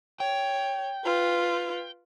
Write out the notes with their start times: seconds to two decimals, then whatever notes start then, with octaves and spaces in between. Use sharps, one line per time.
0.20 C#5 G5
1.05 F4 B4